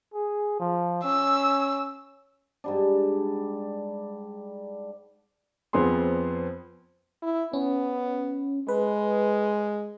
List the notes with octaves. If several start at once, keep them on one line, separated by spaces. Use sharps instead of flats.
G#4
F3
C#4 E6
G#2 G3 D4
F2 B3 C4 G#4 C6
E4
B3 C#4
G#3 B4